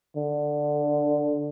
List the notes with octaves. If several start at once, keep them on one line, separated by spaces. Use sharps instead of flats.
D3